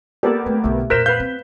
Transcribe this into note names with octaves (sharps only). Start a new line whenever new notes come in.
A#3 B3 G4 A4 D5
A3 C4
B1 D3 A3
F2 A#2 A#4 C5 F#6 B6 E7
B4 F5 G6
C4